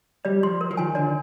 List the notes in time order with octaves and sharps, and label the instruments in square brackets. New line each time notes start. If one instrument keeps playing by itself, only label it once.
[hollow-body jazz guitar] G3 [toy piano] D5
[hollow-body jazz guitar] F3 [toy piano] C6
[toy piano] A#4
[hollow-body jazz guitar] F3
[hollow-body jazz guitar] D#3 [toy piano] G#5
[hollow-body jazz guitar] D3 [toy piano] D5